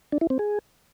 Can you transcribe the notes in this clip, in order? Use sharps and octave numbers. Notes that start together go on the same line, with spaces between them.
D4
E4
C4
G#4